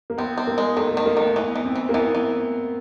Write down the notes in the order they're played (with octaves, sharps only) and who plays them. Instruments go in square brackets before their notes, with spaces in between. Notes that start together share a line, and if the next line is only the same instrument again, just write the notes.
[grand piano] A#3
[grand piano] B3 [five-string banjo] C4
[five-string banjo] C4
[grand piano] A#3
[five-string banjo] G#3
[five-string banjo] D#3 [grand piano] A3
[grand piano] A3
[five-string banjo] D#3
[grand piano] A#3
[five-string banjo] D#3 [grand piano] B3
[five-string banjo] E3 [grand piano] B3
[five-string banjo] E3
[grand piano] C4
[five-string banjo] E3
[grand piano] A#3
[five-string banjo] E3 [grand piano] B3
[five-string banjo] E3